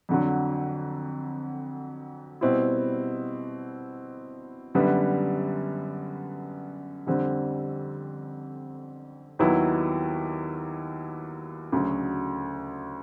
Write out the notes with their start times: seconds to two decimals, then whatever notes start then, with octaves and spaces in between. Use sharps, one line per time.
0.09 F2 D3 F#3
2.41 B2 G3 C4 E4
4.75 F#2 D3 G3 B3
7.07 F2 D3 G3 C4
9.39 D#2 D#3 F#3 B3 E4
11.72 D2 C#3 F#3